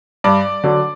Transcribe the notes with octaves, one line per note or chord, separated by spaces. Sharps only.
G2 D5
D3 F#3